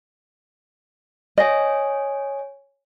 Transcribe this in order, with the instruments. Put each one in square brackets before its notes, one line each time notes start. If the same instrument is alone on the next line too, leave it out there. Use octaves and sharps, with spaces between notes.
[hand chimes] C#5 G#5 [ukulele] D#5